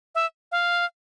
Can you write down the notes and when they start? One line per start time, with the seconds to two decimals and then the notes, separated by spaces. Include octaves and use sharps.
0.15 E5
0.52 F5